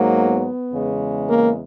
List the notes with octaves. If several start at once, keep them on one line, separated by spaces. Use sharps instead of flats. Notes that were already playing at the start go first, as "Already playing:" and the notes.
Already playing: G#2 F#3 A#3
B3
E2 C#3 G#3
A#3